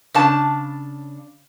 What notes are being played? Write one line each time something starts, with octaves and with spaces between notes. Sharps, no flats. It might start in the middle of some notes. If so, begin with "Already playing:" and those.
C#3 D4 A5